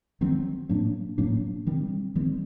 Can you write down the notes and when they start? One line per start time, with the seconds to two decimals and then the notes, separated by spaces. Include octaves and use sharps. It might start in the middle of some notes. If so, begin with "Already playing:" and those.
0.21 D#3 F#3 C4
0.69 A2 F#3 A#3 D4
1.18 A2 F#3 A#3 D4
1.67 D#3 G3 C4
2.15 D#3 G3 C4